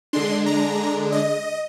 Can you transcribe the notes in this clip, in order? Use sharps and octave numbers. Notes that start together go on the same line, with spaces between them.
D3 G#3 D4 C6
A#5
D#5